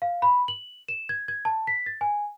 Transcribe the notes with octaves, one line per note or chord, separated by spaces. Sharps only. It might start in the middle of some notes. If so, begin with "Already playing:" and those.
F5
B5
F#7
E7
G#6
G#6
A5
B6
A6
G#5